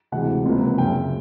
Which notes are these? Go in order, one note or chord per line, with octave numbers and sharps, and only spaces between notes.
D2 C3 E3 G#3 F#5
C#2 C3 F3 A#3
F#1 F#2 C#3 G5